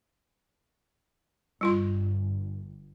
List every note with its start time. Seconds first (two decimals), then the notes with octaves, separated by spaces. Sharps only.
1.61 G1 G3 F4 C6